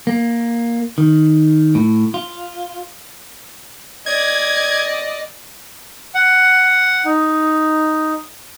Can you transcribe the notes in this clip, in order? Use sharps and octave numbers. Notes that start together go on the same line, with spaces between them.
A#3
D#3
A2
F4
D5 D#5 G#6
F#5
D#4